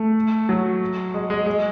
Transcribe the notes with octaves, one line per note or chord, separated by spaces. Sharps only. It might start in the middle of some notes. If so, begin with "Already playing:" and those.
Already playing: A3
F#3
G#3
G#3
G#3